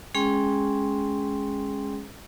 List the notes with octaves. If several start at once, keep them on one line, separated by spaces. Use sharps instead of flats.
G#3 C#4 G#4 G5 C6